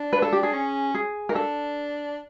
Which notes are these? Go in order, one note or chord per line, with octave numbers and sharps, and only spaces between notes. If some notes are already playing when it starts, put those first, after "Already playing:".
Already playing: D4
B4
A4
G4
G#4
C#4
G#4
D#4 A#4
D4 A4